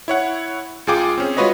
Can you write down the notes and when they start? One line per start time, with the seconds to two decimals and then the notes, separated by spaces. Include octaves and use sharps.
0.08 E4 C#5 F#5
0.87 C#2 F4 G#4 G5 D6
1.18 C4 C#4 G#4
1.37 G#3 F4 F#4 B4 C#5 D#5